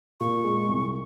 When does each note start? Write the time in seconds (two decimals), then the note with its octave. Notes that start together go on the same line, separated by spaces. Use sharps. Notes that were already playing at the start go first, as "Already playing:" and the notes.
0.20 A#2 C#6
0.44 G#3
0.69 C2